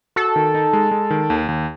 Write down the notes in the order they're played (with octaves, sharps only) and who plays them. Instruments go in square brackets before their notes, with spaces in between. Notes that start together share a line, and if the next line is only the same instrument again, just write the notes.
[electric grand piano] F#4 [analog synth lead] A4
[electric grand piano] D#3
D#4
G#3
G#3
D#3
D#2
D#2